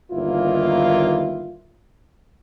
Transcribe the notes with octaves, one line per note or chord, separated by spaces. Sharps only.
G1 D#2 D#3 A#3 E4 F4